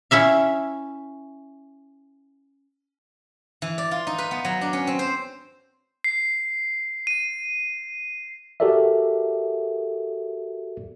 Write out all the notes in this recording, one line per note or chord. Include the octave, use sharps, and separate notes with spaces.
C#4 E4 E5 F5
E3
D5
F4
D#4
B4
B3
F#3
D4
C#4
C4
C5
C7
D#7
F#4 G4 A4 A#4 D5 E5